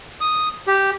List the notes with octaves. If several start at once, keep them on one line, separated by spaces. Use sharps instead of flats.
D#6
G4